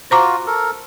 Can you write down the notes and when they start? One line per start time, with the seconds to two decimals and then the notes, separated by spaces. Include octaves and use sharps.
0.11 F4 F#4 C5 A#5 D6
0.47 A4 A#4